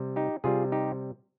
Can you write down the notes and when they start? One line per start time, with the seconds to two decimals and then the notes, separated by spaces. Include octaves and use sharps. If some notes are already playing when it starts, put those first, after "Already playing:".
Already playing: C3 G3
0.16 D#4 G4
0.44 C3 G3 F4 G#4
0.72 D#4 G4